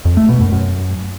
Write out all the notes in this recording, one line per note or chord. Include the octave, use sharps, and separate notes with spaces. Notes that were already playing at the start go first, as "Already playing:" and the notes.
F2
A3
B2
F#2
F#2